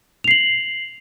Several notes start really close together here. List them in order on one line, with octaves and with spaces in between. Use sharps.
F7 C7 F#7